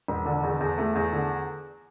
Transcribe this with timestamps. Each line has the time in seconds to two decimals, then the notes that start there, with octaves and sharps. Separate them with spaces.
0.08 E1
0.26 D3
0.43 E2
0.61 E2
0.78 A3
0.95 E2
1.13 D3